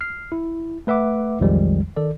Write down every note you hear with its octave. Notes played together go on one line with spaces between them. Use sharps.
F6 C7
E4
A3 B4 E5 F#5 D6
B1 F2 D#3 F3 G3 G#3
D#3 A4 D5